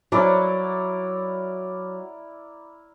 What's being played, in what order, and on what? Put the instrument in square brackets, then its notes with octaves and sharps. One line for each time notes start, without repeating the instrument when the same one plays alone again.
[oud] F#3 [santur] E4 A#4 D5